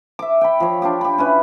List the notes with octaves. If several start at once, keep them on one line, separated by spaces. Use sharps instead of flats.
E5 D6
G5 B5
F3 C#5
D4 F4 G4
G4 B5
C#4 E4 B4